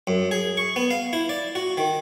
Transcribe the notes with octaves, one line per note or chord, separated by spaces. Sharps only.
F#2
G#4
C#6
B3
F5
E4
D5
F#4
D#3